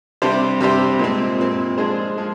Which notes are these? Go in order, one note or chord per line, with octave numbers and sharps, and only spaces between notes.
C3 G3 D4 G4 C5
C3 G3 D4 G4 C5
A#2 G#3 C4
A#2 G#3 C4
F3 G#3 D4 G#4 C5
F3 G#3